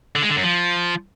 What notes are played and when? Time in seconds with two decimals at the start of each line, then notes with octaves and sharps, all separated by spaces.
0.15 D3
0.22 G#3
0.29 D3
0.36 F#2
0.43 F3